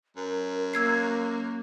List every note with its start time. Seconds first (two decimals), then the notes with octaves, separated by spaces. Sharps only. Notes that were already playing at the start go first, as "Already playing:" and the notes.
0.16 F#2 A#4
0.74 A#3 E6 G#6 C7